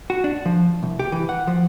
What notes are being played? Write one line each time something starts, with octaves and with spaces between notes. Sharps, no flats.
F#4
D4
F3
C2
G4
E3
F#5
F3